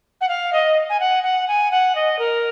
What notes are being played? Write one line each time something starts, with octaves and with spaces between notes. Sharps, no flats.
F#5
F5
D#5
G#5
F#5
F#5
G#5
F#5
D#5
A#4